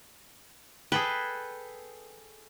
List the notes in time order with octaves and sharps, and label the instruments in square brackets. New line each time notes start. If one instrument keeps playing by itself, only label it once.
[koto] G#4 A4 G5 [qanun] B4